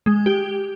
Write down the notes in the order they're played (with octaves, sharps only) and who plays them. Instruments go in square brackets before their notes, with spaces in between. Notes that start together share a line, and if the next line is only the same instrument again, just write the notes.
[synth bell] G#3
G4